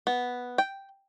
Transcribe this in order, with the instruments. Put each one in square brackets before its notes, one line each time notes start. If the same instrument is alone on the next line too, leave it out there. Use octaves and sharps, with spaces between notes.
[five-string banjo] B3
G5